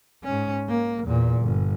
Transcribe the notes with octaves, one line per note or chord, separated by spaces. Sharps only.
G#2 C#4
A#3
E2 A#2
G1